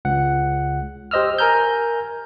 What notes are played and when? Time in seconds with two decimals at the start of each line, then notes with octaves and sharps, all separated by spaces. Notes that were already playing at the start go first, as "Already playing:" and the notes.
0.05 C#2 F#5
1.11 G4 C5 D#5 E6 F6
1.38 A#4 G#5 A#5 F6 G6